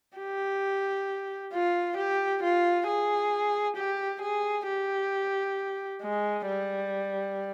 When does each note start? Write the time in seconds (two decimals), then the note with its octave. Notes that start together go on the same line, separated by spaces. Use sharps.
0.18 G4
1.53 F4
1.97 G4
2.43 F4
2.87 G#4
3.76 G4
4.21 G#4
4.67 G4
6.02 G#3
6.47 G3